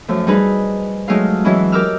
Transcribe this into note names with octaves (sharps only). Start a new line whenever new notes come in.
F#2 F3 A3
G3 D#4 G#4 B4
F#3 G#3 A3 D#4 F4 F5
E3 F#3 G#3 C#4 E4
G4 A#4 D6 E6 F6